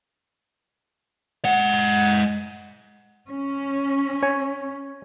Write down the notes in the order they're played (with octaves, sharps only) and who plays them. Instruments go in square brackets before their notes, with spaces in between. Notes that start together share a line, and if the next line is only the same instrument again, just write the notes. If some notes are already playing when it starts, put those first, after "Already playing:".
[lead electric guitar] G#3 F#5
[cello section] C#4
[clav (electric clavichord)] C#5 G#5